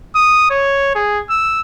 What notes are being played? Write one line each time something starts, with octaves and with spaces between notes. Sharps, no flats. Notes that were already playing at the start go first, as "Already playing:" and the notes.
D#6
C#5
G#4
E6